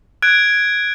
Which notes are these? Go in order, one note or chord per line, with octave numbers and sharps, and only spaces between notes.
F#6 G#6 D7